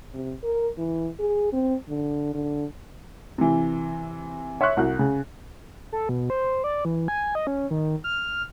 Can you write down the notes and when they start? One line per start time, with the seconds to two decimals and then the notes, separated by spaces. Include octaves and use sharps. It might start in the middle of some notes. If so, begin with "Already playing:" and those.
0.14 C3
0.43 A#4
0.78 E3
1.19 G#4
1.52 C4
1.88 D3
2.34 D3
3.38 C3 E3
4.61 C#5 E5 C6 C#6 F#6
4.77 C2 F#4 F#6
4.99 C#3
5.93 A4
6.09 B2
6.30 C5
6.64 D5
6.85 E3
7.08 G#5
7.35 D#5
7.47 C#4
7.71 D#3
8.04 F6